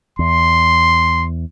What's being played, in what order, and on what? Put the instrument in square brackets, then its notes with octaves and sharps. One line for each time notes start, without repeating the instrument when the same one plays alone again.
[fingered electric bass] E2 [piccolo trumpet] C6